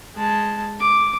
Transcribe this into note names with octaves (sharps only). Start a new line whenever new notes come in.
G#3 A5
D6